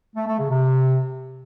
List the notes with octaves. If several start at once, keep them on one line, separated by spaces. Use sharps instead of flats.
A3
A3
C#3
C3